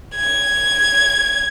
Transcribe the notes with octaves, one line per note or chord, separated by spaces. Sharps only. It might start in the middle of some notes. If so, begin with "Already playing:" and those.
G#6